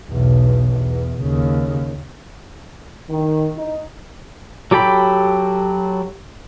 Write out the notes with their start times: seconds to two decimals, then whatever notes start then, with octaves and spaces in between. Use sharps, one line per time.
0.11 B1 E2
0.73 E2
1.21 D#2 C#3
3.10 D#3
3.57 D#4
4.71 F#3 G4 A4 G5 B5